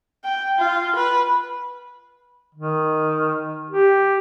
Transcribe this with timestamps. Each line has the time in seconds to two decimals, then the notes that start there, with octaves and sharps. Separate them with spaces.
0.25 G5
0.58 F4
0.96 B4
2.55 D#3
3.71 G4